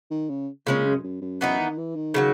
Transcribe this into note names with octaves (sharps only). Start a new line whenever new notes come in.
D#3
C#3
A#2 C#3 G#3 C#4
F#2
F#2
F#2
F#2 E3 B3 D#4
D#3
E3
D#3
C#3 F#3 A#3